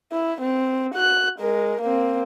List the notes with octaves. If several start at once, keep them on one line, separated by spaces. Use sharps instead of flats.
E4
C4
F#4 F#6
G#3 A#4
A#3 C4